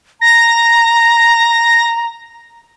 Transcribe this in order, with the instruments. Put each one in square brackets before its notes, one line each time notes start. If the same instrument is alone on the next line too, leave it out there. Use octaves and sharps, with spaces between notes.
[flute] A#5 [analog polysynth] A#6